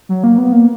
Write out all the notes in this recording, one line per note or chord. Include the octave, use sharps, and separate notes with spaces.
F#3
A#3
B3
A#3